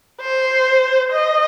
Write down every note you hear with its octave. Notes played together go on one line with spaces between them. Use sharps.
C5
D#5